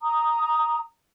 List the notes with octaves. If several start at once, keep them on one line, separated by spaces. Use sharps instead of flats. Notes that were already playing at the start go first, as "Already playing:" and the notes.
A#5 D#6